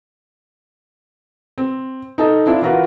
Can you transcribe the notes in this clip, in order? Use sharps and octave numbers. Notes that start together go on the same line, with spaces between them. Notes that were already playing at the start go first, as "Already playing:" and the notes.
C4
D#4 A4 D#5
C4 D4 E4 F4
E3 F4 F#4 A#4 B4